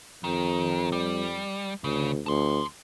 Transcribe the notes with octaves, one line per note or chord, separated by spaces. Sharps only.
F2 D#3
G3
D2 C#3
D2 A5 C6